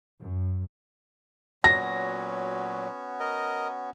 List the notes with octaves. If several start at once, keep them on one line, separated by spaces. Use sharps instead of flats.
F#2
A#2 F#3 B3 C#4 F#4 A#6
A#4 D#5